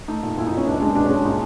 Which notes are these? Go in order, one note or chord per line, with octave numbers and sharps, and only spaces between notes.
A3 D#4
A#2
A#2 E4
D#4
A#2 C#4
C#2 D4
G#3 D4
B2 D4
C#4
G#3 D4
A#2 D#4